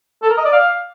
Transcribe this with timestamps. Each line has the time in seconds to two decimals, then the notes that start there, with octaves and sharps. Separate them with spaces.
0.22 A4
0.30 A#4
0.38 D#5
0.45 D5
0.53 F5